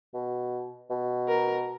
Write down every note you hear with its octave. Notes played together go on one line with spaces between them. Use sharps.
B2
B2
A#4